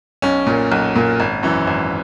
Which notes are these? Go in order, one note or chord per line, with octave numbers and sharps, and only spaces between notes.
B1 C#4
A#2 A#3
B1
A#2 A#3
G#1
F#2 E3
G#1